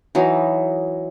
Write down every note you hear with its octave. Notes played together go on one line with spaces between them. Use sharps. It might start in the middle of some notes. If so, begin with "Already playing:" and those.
E3 F#3 D#4